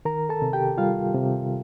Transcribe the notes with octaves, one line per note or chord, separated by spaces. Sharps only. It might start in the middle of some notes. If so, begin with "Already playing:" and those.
D#3 A#4 A#5
A4 A5
C3
G4 G5
G3 F4 F5
C3